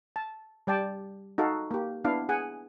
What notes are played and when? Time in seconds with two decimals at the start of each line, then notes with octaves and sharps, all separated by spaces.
0.16 A5
0.67 G3 D5 G5 A5
1.38 D#4 F#4 A4 F5
1.71 A#3 G4
2.04 B3 D4 E4 F5
2.29 G#4 F#5 G#5